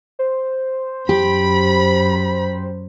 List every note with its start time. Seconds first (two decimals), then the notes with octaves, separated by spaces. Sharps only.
0.19 C5
1.09 F#2 G4 B5